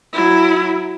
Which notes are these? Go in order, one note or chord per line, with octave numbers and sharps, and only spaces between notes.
F#3 E4